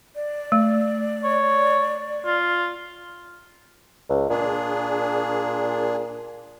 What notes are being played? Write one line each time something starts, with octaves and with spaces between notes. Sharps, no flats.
D5
A3
C#5
F4
C#2
A#2 D4 G#4